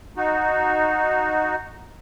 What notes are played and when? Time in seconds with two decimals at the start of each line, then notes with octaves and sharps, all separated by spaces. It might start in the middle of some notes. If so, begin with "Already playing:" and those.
0.17 D#4 F#4